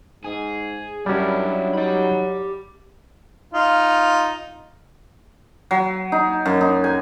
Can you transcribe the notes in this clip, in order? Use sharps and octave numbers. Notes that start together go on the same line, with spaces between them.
G#2 G#4
F#2 F#3 G3 C#4 D4 E4
D#4 G4 B5
D#4 F4
F#3
D#4
F#2
D#4
G#5